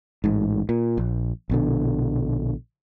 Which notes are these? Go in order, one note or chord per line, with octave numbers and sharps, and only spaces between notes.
A1 G#2
A#2
A#1
A#1 B2 D3